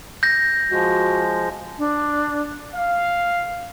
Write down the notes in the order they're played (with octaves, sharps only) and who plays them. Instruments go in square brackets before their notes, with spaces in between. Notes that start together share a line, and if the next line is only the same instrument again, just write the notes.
[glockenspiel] G6 A#6
[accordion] F3 G#3 [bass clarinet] F#4
[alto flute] D4
[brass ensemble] F5